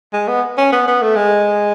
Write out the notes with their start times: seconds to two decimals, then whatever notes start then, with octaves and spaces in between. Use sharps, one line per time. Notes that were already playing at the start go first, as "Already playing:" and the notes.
0.14 G#3
0.28 B3
0.58 C#4
0.72 B3
0.88 B3
1.02 A3
1.16 G#3